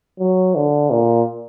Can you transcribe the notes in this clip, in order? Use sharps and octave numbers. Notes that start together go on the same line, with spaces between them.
F#3
D3
A#2